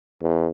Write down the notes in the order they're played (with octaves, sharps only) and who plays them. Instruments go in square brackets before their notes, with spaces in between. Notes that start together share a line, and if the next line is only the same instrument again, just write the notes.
[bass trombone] E2